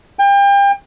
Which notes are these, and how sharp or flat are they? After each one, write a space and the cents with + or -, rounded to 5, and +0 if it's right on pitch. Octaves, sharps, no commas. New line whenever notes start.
G5 +35